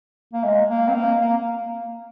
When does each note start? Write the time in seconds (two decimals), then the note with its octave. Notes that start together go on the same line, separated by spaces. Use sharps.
0.33 A#3
0.44 G#3
0.70 A#3
0.88 C4
0.95 A#3
1.21 A#3